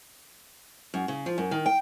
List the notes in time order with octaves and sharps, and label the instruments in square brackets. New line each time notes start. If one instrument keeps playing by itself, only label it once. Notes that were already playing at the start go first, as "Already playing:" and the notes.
[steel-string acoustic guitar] F#2
C#3
F3
F#2
D#3
G5